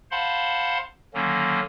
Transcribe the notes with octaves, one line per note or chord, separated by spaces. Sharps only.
C5 F5 F#5 A5 B5 C6
D3 D#3 F#3 A#3 C#4